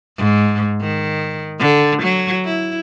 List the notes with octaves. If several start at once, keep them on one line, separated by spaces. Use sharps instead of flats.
G#2
D#3
D3
F#3
E4